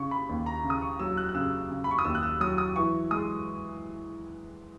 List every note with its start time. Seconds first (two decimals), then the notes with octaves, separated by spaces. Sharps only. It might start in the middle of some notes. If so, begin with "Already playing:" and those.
Already playing: C#3 C#6
0.11 B5
0.29 D#2
0.46 A#5
0.64 C#3
0.70 D#6
0.82 C#6
0.99 F#3 E6
1.17 F#6
1.29 F#6
1.35 C#3 E6
1.71 C#3
1.84 B5
1.91 C#6
1.99 D#6
2.05 D#2 E6
2.15 F#6
2.23 E6
2.40 F#3 D#6
2.58 D#6
2.76 E3 C#6
3.11 G#3 D#6